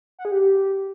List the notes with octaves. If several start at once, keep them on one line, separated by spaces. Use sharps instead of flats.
F#5
G#4
G4